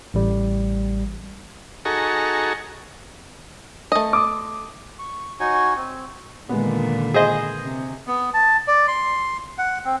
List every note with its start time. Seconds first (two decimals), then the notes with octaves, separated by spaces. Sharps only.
0.14 A1 G3
1.85 D#4 F#4 G#4 A4 A#5 C#6
3.92 A3 D#5
4.13 C6 D6 D#6
4.99 C#6
5.40 D#4 F#4 C#5 G#5
5.77 C4
6.49 A#2 D3 D#3 G#3 B3
7.14 G#4 C5 D#5
7.63 C3
8.07 B3
8.34 A5
8.68 D5
8.88 C6
9.58 F#5
9.85 C4